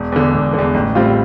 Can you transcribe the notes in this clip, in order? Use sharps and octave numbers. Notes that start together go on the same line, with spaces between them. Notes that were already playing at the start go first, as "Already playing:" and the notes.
Already playing: E1
E2 D3
E1
E2 D3
A1
A2 G3 C4 F4